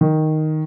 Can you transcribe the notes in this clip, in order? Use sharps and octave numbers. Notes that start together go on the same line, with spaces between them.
D#3